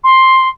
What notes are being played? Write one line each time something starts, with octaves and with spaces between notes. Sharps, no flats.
C6